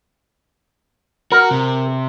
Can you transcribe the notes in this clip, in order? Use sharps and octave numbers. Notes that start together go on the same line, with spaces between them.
F#4 A#4
C3